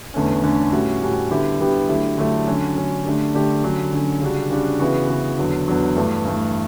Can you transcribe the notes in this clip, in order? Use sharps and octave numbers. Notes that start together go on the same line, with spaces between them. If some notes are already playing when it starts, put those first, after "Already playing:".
E2 D3 A3 C#4
E2 D3 A3 C#4
A2 G3 C#4 F#4
A2 G3 C#4 F#4
D3 G3 B3 E4 G4
D3 G3 B3 E4 G4
D3 F#3 A3 E4 G4
D3 F#3 A3 E4 G4
D3 F#3 C#4
D3 F#3 C#4
D3 A3 D4 G4
D3 A3 D4 G4
D3 F#3 C#4
D3 F#3 C#4
C#3 G3 D4 F#4
C#3 G3 D4 F#4
C#3 E3 B3 F#4
C#3 E3 B3 F#4
E2 D3 F#3
E2 D3 F#3
G2 E3 A3
G2 E3 A3